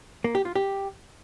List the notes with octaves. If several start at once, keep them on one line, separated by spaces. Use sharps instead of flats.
A#3
G4
F4
G4